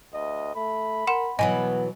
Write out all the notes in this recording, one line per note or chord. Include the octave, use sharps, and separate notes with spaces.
D2 D#5
A3 B5
A#4 F#5 C6 E7
B2 E3 F#3 B3 D#5 G#5